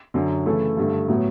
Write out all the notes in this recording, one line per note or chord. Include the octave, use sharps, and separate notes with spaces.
F#2 D3 F#3
C#3 E3 A3 E4 A4
G2 D3 A3
A2 F#3 B3